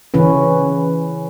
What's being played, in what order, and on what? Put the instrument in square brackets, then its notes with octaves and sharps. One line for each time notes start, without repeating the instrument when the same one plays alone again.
[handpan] C#3 E3 C#4 B4